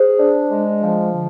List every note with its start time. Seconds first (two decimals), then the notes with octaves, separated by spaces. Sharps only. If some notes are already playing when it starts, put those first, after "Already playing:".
Already playing: G#4 C5
0.19 D4
0.51 G#3
0.81 F3
1.12 D3